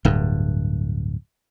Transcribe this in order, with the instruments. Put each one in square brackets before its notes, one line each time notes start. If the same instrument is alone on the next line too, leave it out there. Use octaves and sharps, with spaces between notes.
[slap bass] D1 G2